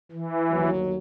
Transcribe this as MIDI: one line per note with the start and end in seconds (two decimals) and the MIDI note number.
0.12 0.69 52
0.50 0.97 31
0.50 0.97 39
0.50 0.97 54